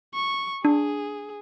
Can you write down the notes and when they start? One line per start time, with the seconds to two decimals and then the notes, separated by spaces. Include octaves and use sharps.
0.14 C#6
0.65 D4 G#4